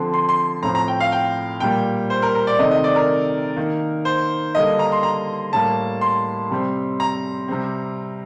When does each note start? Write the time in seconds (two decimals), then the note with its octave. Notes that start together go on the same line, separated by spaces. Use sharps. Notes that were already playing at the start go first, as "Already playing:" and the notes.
Already playing: D3 F3 C4 C6
0.14 C6
0.29 C6
0.63 A2 F3 C4 A#5
0.75 A#5
0.88 G5
1.00 F5
1.12 G5
1.60 A#2 G3 A#3 G5
2.10 C5
2.22 A#4
2.35 A#4
2.47 D5
2.59 C3 D#3 A3 C4 D#5
2.71 D#5
2.84 D5
2.96 A#4
3.56 D#3 A#3
4.05 C5
4.55 D3 G3 A#3 D#5
4.79 A#5
4.92 C6
5.03 A#5
5.53 A2 G3 A#3 A5
6.01 C6
6.50 C3 G3 C4
7.00 A#5
7.48 C3 G3 C4